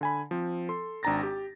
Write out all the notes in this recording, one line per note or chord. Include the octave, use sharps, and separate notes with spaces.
D3 G#5 B5
F3 C4
A4 C6
G#1 D4 G5 A#5 A6 A#6
G4